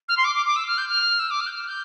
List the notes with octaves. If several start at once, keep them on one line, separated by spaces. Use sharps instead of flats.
F6
C6
D6
D6
D6
E6
F6
G6
F6
E6
D6
F6
G6
F6
G6